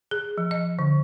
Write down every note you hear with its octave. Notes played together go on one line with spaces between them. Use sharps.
G#4
F3
D#5
D3